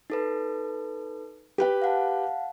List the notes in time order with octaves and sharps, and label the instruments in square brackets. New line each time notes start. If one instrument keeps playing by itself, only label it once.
[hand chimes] D#4 A4 B4
[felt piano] G4 B4 G5
[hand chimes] F5 F#5 A5